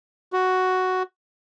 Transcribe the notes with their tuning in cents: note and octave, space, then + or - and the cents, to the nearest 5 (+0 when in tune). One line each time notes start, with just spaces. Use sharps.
F#4 +5